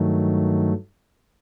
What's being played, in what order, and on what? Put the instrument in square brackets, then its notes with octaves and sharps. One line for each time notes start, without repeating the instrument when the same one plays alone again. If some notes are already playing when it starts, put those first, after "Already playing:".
Already playing: [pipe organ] G2 D#3 F#3 A3